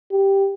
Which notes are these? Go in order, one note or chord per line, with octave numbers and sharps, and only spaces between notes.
G4